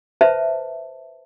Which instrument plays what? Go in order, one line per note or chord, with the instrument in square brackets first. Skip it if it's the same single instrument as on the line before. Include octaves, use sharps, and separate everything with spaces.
[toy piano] B4 C5 E5 A5